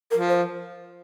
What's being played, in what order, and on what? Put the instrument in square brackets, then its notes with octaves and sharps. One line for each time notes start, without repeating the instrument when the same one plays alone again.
[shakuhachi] A#4
[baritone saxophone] F3
[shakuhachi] C5